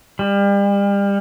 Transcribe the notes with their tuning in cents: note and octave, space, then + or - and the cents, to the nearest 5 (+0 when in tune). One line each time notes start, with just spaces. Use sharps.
G3 +35